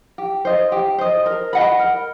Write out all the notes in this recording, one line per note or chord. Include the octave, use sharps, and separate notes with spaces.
G4
C5 D#5
G4
C5 D#5
A#4
D#5 F#5 B5
A#4